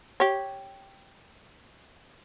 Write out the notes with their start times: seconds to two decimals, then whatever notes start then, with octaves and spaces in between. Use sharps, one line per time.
0.20 G4 C#5